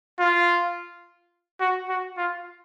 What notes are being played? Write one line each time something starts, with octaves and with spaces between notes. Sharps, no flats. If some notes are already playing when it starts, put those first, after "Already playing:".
F4
F#4
F#4
F4